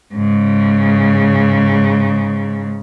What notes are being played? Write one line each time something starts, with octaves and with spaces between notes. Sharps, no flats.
G#2 C#3